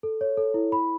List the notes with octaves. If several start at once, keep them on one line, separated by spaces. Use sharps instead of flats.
A4
C#5
A4
E4
B5